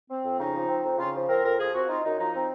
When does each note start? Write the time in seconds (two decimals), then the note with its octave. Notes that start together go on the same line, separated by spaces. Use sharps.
0.10 C4
0.25 F2
0.39 C#3 D#4
0.54 F3
0.69 C4
0.83 F2
0.98 C#3 F4
1.14 F3
1.29 C4 A#4
1.44 F2 A#4
1.59 F3 G#4
1.73 C4 F#4
1.89 D#4 F4
2.04 F#2 D#4
2.19 F3 D#4
2.34 C4